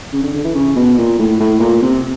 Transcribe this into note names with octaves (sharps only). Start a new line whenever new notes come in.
C#3
D3
D3
E3
C#3
B2
A#2
A2
A2
A#2
C3